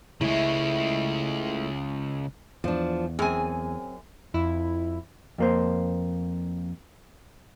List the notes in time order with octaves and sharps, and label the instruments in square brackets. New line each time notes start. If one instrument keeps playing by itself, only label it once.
[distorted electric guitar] C#3 G#3 [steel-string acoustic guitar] A3 E4
[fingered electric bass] E2 [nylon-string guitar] F3 D4
[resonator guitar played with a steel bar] F#2 G#5 [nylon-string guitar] C4 G#4
[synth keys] F2 E4
[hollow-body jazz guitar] F2 A#3 C5